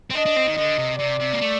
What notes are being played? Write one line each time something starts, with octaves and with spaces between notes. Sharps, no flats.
C4
D4 D#5
D4
C4
D#3
D3 D#5
C3
C3 D5
C3
A#3
A3